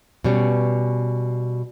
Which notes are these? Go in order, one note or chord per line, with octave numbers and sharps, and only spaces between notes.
B2 G3 C#4